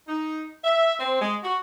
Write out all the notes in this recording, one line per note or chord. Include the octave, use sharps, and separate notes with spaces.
D#4
E5
C4
G#3
F#4